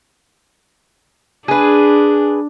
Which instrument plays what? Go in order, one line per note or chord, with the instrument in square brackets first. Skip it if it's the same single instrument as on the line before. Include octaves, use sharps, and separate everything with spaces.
[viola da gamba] D4 [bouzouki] G#4 B4